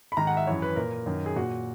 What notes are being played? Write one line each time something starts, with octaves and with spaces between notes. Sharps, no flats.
B5
G#2 D#3 A#5
F#5
E5
F#2 E3 C#5
B4
A#2 A#4
F#2 D#3
G#4
A#2 F#4